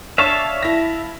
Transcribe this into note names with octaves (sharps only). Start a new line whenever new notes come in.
D4 C#5 E5 F5 A5 C#6
E4 A#6